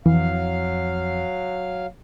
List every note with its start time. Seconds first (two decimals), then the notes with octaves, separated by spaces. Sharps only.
0.06 F2 E3 F#3 F5